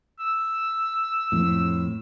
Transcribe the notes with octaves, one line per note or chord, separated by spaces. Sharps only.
E6
F2 A2